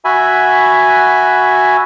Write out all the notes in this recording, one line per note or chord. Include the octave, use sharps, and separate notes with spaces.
F#4 E5 G#5 B5